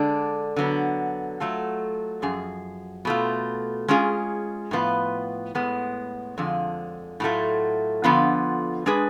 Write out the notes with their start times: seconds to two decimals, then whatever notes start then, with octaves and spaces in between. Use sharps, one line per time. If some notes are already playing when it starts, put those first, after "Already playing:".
Already playing: D3 G#3 D4
0.56 D3 F#3 B3
1.40 F#3 A3 F4 A4
2.22 F#2 F3 G#4
3.05 B2 A3 F4
3.88 G#3 C#4 F4 G#4
4.71 A2 F3 B3 F4 B4
5.55 A2 G#3 B3
6.38 F2 D3 F3 G#3
7.20 A2 F#3 A3 F4
8.04 D3 F3 B3 F4
8.86 G#3 D4 G#4 B4